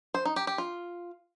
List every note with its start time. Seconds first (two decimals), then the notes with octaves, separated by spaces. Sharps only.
0.14 C5
0.25 D#4
0.36 G4
0.47 G4
0.58 F4